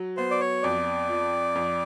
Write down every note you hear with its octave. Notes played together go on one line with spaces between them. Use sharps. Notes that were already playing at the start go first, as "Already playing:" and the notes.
Already playing: F#3
B3 C5
D5
C#5
F2 D5
F3
F2